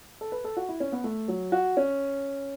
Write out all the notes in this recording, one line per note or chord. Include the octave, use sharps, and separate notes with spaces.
A4
B4
A4
F#4
E4
C#4
B3
A3
F#3
F#4
C#4